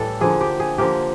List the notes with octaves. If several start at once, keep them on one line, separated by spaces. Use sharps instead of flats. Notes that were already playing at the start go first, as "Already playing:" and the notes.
Already playing: A2 E3 G3 A4
D3 F3 A#3 G#4
G4
G#4
D3 F3 A#3 G4